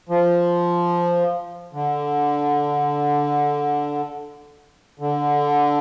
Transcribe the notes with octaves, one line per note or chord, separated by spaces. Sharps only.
F3
D3
D3